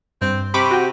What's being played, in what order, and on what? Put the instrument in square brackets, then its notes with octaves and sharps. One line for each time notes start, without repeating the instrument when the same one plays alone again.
[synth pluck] G2 [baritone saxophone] C4
[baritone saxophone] C3 [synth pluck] B5 C#6 D6
[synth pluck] F#4 G5